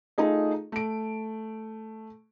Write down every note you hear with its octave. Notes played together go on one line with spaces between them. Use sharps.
A3 D#4 F4 G#4 D#5
A3 D7